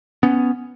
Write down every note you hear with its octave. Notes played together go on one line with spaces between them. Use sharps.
B3 C#4